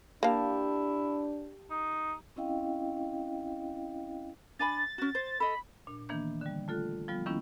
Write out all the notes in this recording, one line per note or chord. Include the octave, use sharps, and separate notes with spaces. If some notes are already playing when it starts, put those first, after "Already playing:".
A#3 D4 E4 G4 F5 A5
D#4
C4 C#4 E4 D#5 F5 G5
D4 G#5 B5 A6
C#4 F#4
C5
A4 D#5 B5
A#2 D4
D#3 E3 A#3 B3 D4 G6
D3 G3
A3 F4 A4 F#6
F3 G3 B3 F4
D#3 G3 A#3 B3 C#4 E4